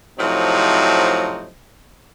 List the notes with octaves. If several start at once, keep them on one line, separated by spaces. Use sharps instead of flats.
A2 C3 F3 F#3 C4 D#4